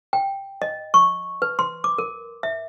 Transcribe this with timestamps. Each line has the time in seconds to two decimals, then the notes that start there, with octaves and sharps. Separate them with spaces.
0.13 G5
0.62 D#5
0.94 C#6
1.42 B4
1.59 C6
1.84 D6
1.98 A#4
2.43 E5